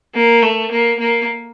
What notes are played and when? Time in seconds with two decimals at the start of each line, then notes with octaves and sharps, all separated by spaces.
0.15 A#3
0.42 A3
0.71 A#3
0.99 A#3